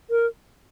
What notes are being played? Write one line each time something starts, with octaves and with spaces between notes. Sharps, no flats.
A#4